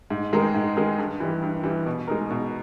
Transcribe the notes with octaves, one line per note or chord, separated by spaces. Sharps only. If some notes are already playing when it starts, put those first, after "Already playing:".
G#2
D#3 G#3 D#4 A#4
G#2
D#3 G#3 D#4 A#4
G2
E3 G3
G2
E3 G3
B2
G#3 D#4 A#4
B2